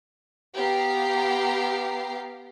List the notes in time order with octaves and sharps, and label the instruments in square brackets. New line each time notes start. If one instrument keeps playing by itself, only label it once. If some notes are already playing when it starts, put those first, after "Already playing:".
[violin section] B3 G4 F5 A#5 C7